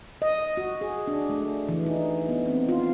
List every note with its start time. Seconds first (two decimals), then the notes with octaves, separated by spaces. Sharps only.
0.22 D#5
0.57 F#4
0.81 G#4
1.08 D4
1.29 A3
1.69 E3
1.86 D#4
2.29 B3
2.46 C4
2.69 F4